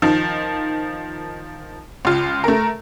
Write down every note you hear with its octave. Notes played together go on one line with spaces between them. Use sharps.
D#3 F3
C#2 F4
A3 A#4